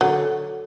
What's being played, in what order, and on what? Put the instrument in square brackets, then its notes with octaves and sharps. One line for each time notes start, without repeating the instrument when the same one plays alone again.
[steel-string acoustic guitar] D3 [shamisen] F#3